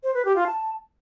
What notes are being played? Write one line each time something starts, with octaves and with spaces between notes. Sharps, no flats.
C5
B4
G4
F4
A5